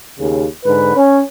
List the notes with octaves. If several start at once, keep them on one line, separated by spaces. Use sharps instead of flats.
D#2 C#3
G#2 D3 B4
C#4